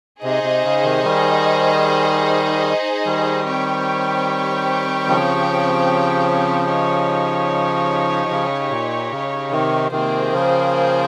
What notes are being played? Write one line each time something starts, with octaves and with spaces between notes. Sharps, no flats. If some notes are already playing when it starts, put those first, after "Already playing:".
C3 D#4 G#4 C5 D#5
C3
C#3
C3 D#3
D#3 G3
D#3 G3
C4 G4 C#5 G5
C#3 F3
D#4 G4 C#5
C#3
A#2
C#3
C3 D#3
C3 D#3 A#3 F4 G#4 C5 G5
C#3 F3